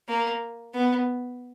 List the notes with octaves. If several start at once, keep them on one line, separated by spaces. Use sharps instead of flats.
A#3
B3